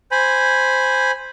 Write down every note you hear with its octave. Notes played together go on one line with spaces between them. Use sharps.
C5 G#5 B5